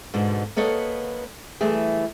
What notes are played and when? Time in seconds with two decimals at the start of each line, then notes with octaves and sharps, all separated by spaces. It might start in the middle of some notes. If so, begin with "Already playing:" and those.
0.14 G#2 B2 D3
0.56 A#3 B3 A4 C#5 D#5
1.61 E3 G3 A3 G#4